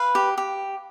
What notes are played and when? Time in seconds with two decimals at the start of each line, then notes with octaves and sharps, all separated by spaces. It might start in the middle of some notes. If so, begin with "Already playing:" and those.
Already playing: B4 F5
0.15 G4
0.38 G4